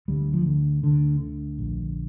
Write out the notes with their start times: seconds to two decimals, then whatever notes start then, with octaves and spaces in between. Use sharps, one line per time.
0.08 D2 G3
0.33 F3
0.46 D3
0.83 D2 D3
1.21 D3
1.59 A#1